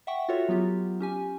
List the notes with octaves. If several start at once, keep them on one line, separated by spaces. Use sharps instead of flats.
E5 F#5 G5 C#6
F4 F#4 A4 C#5 E5
F#3 B3 F4 G4
C#4 G4 G#5